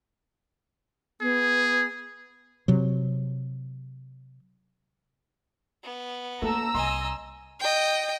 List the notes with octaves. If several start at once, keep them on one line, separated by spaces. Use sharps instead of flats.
B3 G#4
C3 F#3
B3
A3 A#3 A4 A#5 E6
C2 D#5 G#5 C6
D#5 G5